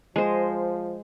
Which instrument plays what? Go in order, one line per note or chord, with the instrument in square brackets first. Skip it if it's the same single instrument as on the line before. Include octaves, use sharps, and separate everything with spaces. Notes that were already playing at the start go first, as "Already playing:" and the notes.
[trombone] F3 [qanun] G#3 C5